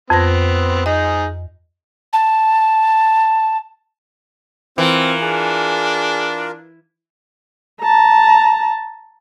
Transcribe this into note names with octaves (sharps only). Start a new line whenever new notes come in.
F2 B3 C4 A#6
D#4 G#4 D#5
A5
E3 C4 F4 A#4
D4 G#4
A5 A#5